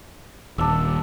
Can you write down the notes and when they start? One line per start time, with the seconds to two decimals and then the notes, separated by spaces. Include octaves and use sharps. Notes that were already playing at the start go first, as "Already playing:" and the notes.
0.58 D#1 D4 E6